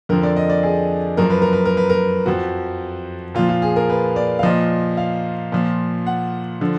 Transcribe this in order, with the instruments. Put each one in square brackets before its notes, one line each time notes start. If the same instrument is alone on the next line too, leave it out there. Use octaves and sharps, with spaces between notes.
[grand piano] F2 D3 F3 A#4
D5
D#5
D5
G#4
F#2 F3 A#4
B4
A#4
B4
A#4
B4
A#4
F2 F3 F#4
A#2 F3 F4
F4
G#4
A#4
B4
D5
F5
A#2 F3 D#5
F5
A#2 F3
F#5
D3 F3